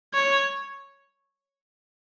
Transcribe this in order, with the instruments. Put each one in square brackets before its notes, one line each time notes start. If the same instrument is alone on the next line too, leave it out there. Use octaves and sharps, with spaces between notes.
[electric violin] C#5